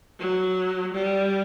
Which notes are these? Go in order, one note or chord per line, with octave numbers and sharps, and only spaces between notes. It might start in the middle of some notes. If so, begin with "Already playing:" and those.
F#3
G3